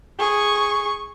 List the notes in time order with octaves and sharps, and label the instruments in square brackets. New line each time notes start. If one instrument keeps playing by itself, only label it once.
[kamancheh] G#4 C#6